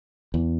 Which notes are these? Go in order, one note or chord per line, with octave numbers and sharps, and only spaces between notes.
E2